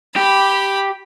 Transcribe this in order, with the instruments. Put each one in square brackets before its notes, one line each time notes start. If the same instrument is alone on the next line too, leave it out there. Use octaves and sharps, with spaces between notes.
[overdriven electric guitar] G4 [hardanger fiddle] B5